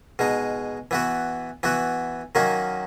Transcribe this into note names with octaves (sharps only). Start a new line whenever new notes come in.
B2 G#3 D#4
E3 B3 F#4
E3 B3 F#4
D#3 F#3 A#3 C#4 F#4